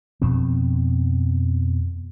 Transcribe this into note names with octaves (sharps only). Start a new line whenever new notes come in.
F2 B2 C4